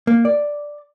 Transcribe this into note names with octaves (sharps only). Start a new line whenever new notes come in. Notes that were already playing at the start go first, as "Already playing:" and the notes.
A#3
D5